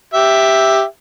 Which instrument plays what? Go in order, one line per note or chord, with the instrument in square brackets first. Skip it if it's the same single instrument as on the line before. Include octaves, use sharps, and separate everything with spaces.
[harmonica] G4 E5